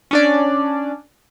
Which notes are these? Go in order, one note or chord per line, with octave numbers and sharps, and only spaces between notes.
C#4 D4 D5